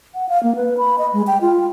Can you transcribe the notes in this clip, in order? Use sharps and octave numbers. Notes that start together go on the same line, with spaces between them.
F#5
F5
A#3
B4
B5
D#5
G#3
G5
F4